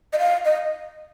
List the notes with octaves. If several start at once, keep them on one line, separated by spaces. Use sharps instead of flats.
D#5
F5
D#5